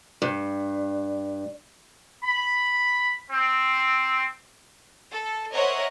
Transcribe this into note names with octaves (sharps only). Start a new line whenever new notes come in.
G2
B5
C4
A4
A#4 C5 C#5 D#5 E5 F#5